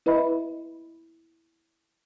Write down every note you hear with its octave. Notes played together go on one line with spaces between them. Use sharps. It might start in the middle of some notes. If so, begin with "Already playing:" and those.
E4 B4 D#5 E5 B5